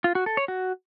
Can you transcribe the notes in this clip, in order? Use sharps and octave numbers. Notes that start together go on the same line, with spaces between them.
F4
F#4
A4
C#5
F#4